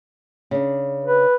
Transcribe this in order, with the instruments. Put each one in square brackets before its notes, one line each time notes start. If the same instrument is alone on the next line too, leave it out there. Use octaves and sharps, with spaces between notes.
[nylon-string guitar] C#3 D4
[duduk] B4